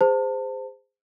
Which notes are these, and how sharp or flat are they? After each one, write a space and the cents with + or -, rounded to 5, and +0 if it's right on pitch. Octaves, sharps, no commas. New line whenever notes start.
G#4 -25 C5 -20 A5 +30